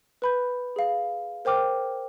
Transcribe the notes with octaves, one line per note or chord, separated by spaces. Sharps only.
B4 B5 G6
G#4 F5
A#4 C5 G5 D6 F6